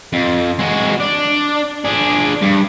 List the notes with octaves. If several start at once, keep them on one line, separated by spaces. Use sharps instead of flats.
F2
G#3 F#4
D4
D4 G#4
G2